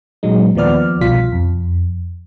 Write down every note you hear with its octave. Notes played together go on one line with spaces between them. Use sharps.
A#2 F#3 G#3 D#4
D#2 F3 B3 D5 F6
C2 B2 F4 F5 B6
F2